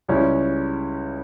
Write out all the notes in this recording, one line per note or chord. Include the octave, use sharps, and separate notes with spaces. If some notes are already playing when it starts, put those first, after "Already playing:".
C#2 C#3 G3 C#4 E4